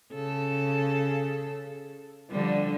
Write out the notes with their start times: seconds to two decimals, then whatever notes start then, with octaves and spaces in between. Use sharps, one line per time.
0.14 C#3 A4
2.31 D3 F3 G3